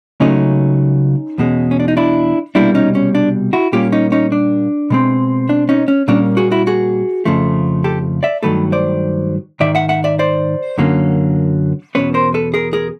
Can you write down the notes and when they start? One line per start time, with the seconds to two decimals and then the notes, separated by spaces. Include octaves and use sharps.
0.20 C#2 C#3 F#3 A3 C#4 D#4
1.38 E2 B2 G#3 C#4
1.71 C#4
1.80 D4
1.88 D#4
1.97 D4 E4
2.55 C2 B2 G3 A#3 D4 E4
2.75 C#4 D#4
2.95 C#4
3.15 D4
3.53 E4 F#4
3.72 A#2 G3 A#3 C#4 F4 G4
3.92 C#4 D#4
4.12 C#4 D#4
4.32 D4
4.90 B2 G#3 C4
5.49 D4
5.69 C#4 D#4
5.88 C#4
6.08 A#2 G3 A#3 C#4 D4
6.37 F#4 G#4
6.52 E4 F#4
6.67 F#4 G#4
7.25 F2 C#3 F3 A3
7.84 G4 A4
8.23 D5 E5
8.43 G2 D#3 F#3 A3 A4 B4
8.72 C5 D5
9.60 G#2 D#3 D5 E5
9.75 E5 F#5
9.89 E5 F#5
10.04 D5 E5
10.19 C5 D5
10.78 F#2 D3 F#3 A#3 C#4
11.95 E2 B2 G#3 C#4 B4 C#5
12.14 A#4 C5
12.34 A4 B4
12.54 G#4 A#4
12.73 G#4 A#4